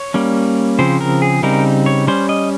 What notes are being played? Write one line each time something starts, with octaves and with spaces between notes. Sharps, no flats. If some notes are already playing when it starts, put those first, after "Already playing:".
Already playing: C#5
G3 A#3 C#4
C#3 F3 C4 C5
A#4
G#4
C#3 G3 C4 D#4 A#4
C#5
G3 C#4 C5
D#5